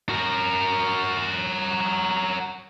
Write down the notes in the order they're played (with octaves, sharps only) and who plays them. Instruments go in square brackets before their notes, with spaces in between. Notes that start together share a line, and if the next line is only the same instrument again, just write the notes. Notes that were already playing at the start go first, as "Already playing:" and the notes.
[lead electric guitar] F#4 A#4